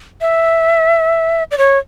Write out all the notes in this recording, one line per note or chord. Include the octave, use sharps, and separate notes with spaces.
E5
D5
C#5